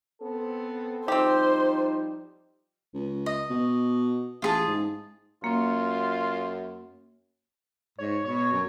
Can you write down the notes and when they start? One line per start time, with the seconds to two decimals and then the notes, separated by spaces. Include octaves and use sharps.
0.22 B3 C4 A4
1.08 F3 G3 C4 D#4 G4 C5
2.94 C#2
3.26 D#5
3.50 B2
4.42 A1 F4 G#4 A5
4.68 G#2
5.44 F#2 A#3 C#4 F4
7.98 G#2 C#5
8.25 B2 C#5
8.53 F#2